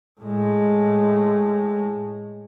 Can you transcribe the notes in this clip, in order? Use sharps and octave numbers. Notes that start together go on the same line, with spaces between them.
A2 G#3